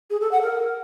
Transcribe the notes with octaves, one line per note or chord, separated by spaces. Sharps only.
G#4
A4
F#5
A#4